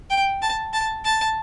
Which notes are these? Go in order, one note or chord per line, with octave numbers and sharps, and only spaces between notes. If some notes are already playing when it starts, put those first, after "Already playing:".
G5
A5
A5
A5